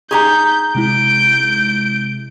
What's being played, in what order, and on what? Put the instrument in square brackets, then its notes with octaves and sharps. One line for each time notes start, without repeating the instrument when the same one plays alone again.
[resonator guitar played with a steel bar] D#4 G4 G#4 [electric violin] G6
[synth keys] C3 G#3 E4 [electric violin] G6 D7